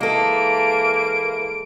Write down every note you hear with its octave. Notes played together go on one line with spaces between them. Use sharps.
E3 G#3 A#3 A4 D7